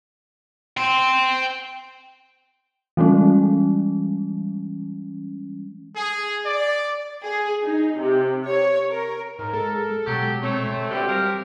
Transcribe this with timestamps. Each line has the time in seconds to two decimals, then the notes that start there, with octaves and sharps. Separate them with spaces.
0.77 G5 C6
2.97 E3 G3 G#3 C#4
5.96 G#4
6.46 D5
7.24 G#4
7.64 D#4
7.99 C3
8.47 C#5
8.91 A#4
9.39 G#2 A#4
9.53 G#3 G#4 A4
10.07 B2 F#3 G#3 G4
10.43 A3 C4 C#5
10.91 G2 B2 D3 F#4 G4 C5 E5
11.09 G3 A#4 F5